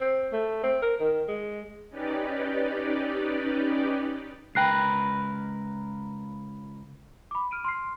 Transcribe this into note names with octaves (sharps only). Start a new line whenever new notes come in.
C4
A3
C4
A#4
D#3
G#3
C#4 D#4 G4 B4 D5
C#2 A#4 B4 G5 F#6 C7
B5 D6
F6 D7 D#7
C6 F6 C7